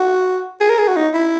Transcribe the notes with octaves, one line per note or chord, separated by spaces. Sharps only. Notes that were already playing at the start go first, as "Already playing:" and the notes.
Already playing: F#4
G#4
A#4
G#4
F#4
D#4
E4